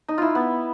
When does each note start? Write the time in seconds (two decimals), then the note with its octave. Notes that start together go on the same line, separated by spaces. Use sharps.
0.08 D#4
0.18 E4 F4
0.35 B3